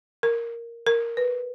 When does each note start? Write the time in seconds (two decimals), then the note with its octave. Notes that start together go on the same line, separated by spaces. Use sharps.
0.23 A#4
0.87 A#4
1.17 B4